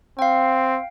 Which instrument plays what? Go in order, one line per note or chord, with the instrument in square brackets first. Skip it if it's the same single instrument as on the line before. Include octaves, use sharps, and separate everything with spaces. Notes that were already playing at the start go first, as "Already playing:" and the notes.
[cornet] C4 [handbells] F5 G5